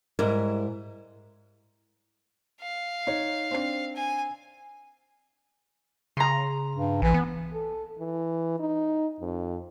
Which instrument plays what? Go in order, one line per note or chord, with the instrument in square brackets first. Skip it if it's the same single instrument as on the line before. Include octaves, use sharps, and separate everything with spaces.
[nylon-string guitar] G#2 G3 E4 A#4
[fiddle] F5
[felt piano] D#4 C#5
C4 D4 C7
[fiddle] G#5
[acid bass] C#3 [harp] A#5 C6
[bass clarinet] G2
[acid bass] A#1 [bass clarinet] E3
[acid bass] B3
[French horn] A4
E3
D#4
F2